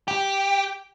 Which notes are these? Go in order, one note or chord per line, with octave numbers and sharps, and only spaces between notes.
G4